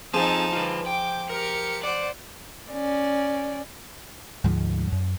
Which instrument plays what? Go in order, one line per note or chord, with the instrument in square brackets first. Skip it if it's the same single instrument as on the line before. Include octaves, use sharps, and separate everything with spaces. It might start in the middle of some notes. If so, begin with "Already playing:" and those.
[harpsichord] F3 G#4 [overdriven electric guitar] C4 F4 [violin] D#4 A5
[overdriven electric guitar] F4 B4
[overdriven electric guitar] G5 [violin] D6
[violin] G4 C#7 [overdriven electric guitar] A#4
[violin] C5 F#5 [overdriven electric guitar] D5
[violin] C#4 D5
[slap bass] D2 G#2 F3 G#3
F#2